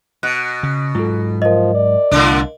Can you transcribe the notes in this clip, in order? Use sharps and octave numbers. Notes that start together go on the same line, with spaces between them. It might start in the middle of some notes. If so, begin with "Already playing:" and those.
B2 F#6
C#3
G#2 F#3 F4 A4
F3 A#4 D#5
D5
C2 A2 D3 D4